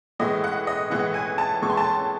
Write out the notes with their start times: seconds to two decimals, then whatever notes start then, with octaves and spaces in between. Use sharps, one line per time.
0.19 A2 E3 G#3 D#5
0.44 F#5
0.67 D#5
0.90 A2 E3 G#3 F#5
1.14 G#5
1.38 A5
1.62 A2 E3 G#3 C#6
1.70 C6
1.77 A5
1.84 C6